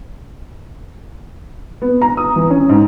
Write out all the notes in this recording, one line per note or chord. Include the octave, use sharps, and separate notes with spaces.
B3
A#5
D#6
E3
C#4
G#2